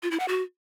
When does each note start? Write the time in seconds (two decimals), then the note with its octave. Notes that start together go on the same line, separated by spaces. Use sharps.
0.03 F4
0.11 E4
0.20 F#5
0.28 F#4